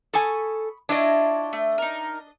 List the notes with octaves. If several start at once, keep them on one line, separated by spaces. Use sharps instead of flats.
A4 G#5 B5 C#6 D#6
D4 E4 F4 C#5 D#5
A3
D#4 A#4